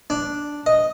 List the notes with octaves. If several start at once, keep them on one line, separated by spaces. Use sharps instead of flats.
D4
D#5